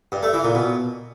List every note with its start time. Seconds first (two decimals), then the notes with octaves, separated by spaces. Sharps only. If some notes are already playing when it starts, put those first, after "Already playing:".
0.12 G2
0.23 A3
0.33 E3
0.44 A#2
0.54 B2